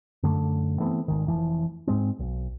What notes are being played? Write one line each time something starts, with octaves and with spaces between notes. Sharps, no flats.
F#2 D3 A3
E3 A3 B3 C4
G#1 D#3
F1 E3 F3
G#2 G#3 C4
B1